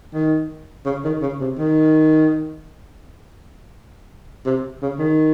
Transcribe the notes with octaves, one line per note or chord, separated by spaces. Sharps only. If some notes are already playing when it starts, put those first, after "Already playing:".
D#3
C#3
D#3
C#3
C3
D#3
C3
C#3
D#3